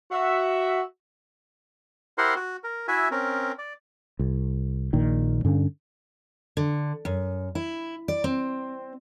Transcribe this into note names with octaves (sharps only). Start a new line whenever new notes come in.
F#4 E5
E4 G4 A#4 C5 F#5 C6
F#4
A#4
E4 F#4 E5 G#5
C4 C#4 A#4
D5
C2
A#1 A#2 D#3
G2 D3 C#4
D3
F#2
E4
D5
C4